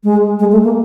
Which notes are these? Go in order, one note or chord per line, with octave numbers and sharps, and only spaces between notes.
G#3
G#3
A3
A#3